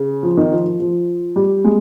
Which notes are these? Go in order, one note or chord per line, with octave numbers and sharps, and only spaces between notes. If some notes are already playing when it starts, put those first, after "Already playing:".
Already playing: C#3
F3
D#3
F3
F3
F3
G3
G#3